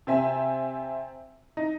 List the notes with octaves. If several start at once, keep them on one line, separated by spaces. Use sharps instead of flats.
C3 C4 E5 G#5
D#4